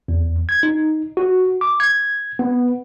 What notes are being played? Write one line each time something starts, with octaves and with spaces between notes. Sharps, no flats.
E2
G#6
D#4
F#4
D6
G#6
B3